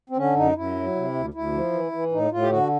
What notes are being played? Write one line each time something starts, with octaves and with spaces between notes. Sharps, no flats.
C4
D3 C#4
F#2 D#4
F#2 E4
F#3
C3
D2
D2 E4
F3
E3
E3
A2 D#4
A2 F4
G4
D3 F#4